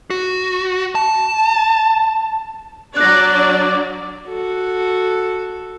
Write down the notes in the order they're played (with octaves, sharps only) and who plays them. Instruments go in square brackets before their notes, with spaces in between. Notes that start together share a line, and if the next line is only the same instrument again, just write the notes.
[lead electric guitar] F#4
A5
[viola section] F#3 D4 D5 [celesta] F#6 A#6
[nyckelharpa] F#4 A4